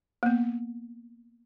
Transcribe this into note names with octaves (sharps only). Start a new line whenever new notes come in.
A#3 B3